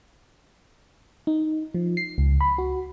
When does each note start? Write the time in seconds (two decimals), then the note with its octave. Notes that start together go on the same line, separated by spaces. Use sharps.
1.27 D#4
1.74 F3
1.97 C7
2.18 C#2
2.41 B5
2.58 F#4